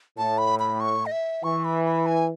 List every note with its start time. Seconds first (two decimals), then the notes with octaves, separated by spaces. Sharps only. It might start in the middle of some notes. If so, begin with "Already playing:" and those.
0.18 A2 A5
0.38 B5
0.59 B5
0.80 C#6
1.06 D#5
1.12 E5
1.44 E3 C#6
1.64 B5
1.85 B5
2.06 G#5